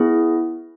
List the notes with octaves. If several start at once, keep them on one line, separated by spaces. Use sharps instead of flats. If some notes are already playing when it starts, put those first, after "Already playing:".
Already playing: B3 E4 G#4